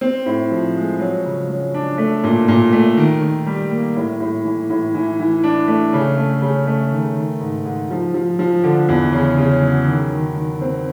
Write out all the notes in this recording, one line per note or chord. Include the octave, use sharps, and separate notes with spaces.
C4
A2
F3
G#3
F#3
C#3
F#3
D4
A3
A#2
A#2
A3
D#3
D#3
G3
A#3
A2
A2
E3
A2
E3
E3
D4
A3
C#3
A3
C#3
A3
D#3
D#3
G#2
G#2
F3
F3
F3
D3
E2
C#3
C#3
F#3
D#3
D#3
D#3
C4